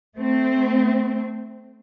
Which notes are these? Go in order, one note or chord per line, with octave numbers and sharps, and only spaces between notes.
A3 C4